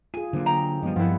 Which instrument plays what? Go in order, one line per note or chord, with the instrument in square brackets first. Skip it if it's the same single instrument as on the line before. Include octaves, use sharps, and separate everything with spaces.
[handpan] F4 G#4 [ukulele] G#5
[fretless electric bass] D3 A#3 [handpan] F#3 F4 C5
[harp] G5 [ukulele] A#5
[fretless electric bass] G2 F3 [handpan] G3 B3 D#5
[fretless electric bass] G2 B3 [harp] F3 C4 E4 [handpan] A#4 F#5